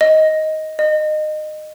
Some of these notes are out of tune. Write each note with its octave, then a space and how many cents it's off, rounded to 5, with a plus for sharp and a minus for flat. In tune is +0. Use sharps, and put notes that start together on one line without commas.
D#5 +10
D#5 -20